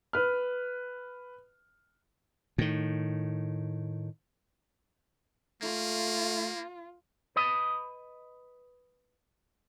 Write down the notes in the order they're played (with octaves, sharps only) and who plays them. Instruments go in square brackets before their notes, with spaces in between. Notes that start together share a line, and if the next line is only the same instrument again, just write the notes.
[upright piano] B4 F6
[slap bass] A2 D#3
[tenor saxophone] A3 [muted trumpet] A#3 [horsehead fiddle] F4
[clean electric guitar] B4 D#5